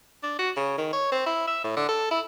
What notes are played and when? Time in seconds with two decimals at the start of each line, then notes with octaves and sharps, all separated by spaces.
0.23 D4
0.39 F#4
0.57 C#3
0.78 D#3
0.93 C#5
1.12 C4
1.26 E4
1.47 E5
1.64 A2
1.77 D3
1.89 A4
2.11 E4